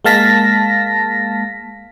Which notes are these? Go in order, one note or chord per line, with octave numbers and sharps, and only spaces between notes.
G#3 A#3 F5 A5 A#6 B6